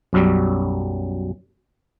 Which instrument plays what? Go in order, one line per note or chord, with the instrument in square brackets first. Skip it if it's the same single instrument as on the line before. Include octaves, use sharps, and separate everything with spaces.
[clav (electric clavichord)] B1 F#2 F#3 G3